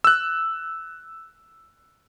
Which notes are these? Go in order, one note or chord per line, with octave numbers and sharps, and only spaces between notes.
E6 F#6